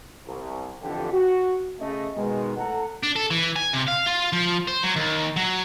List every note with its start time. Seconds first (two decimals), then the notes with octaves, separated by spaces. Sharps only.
0.27 C2
0.82 A1 F2 D3 G4
1.12 F#4
1.80 C#3 A3 D#5
2.15 B2 D#3 G#3
2.57 A2 A4 F#5 A#5
3.03 D4
3.16 A4
3.31 E3
3.56 G#5
3.73 C3
3.87 F5
4.06 F4
4.33 F3
4.68 C5
4.84 F#3
4.96 D#2
5.36 F#3